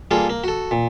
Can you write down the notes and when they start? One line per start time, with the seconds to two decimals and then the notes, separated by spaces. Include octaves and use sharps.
0.11 G3 A#3 F4 G#4 A4
0.29 A#3
0.44 F#4 A4
0.71 A#2